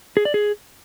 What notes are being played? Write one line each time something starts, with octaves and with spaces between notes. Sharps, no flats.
G#4
D5
G#4